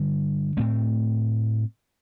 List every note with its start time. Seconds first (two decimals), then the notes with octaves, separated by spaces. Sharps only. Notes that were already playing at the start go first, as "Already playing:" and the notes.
Already playing: G2 D3 G3
0.57 A2 A3 C4